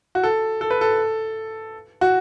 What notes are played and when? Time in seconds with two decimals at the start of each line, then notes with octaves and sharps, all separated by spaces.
0.15 F#4
0.23 A4
0.61 A4
0.70 B4
0.81 A4
2.01 F#4